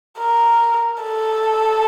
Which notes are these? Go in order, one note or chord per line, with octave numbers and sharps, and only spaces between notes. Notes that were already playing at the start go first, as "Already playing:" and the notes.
A#4
A4